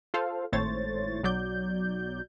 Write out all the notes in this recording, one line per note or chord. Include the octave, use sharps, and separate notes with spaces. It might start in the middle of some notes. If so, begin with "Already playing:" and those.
F4 A4 C5 F5
G#1 A2 A3 C5 C#5 A6
B1 F#3 D5 G6